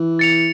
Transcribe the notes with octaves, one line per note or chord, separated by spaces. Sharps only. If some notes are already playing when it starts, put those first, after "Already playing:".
Already playing: E3
A6 C#7 F7